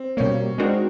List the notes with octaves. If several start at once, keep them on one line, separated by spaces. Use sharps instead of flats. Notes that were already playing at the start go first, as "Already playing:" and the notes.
Already playing: C4
B2 G3 A#3 C#4
G#3 C4 D4 D#4 F#4 A#4